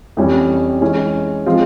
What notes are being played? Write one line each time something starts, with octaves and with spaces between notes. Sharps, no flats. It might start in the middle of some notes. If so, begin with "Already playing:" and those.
F2 E3 G3 C#4
E3 G#3 C#4
F3 G#3 C4 F4